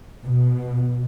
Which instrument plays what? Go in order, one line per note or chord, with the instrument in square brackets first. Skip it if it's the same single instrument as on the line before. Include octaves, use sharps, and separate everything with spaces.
[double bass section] B2